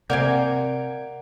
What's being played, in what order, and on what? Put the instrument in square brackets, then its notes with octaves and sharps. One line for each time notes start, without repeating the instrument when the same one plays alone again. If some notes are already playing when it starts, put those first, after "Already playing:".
[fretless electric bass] C3 [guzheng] A#3 F5 G#5 [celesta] D5 D7 [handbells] F#5 G6